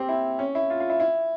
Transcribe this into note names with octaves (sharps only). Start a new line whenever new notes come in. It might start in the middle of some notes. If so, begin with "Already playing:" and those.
Already playing: C4 G4
E4
C#4
E4
F4
F4
E4
E4